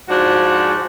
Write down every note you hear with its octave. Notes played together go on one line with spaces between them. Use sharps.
G#2 F3 D4 F#4